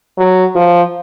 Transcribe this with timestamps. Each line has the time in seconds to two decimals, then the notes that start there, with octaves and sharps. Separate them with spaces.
0.18 F#3
0.55 F3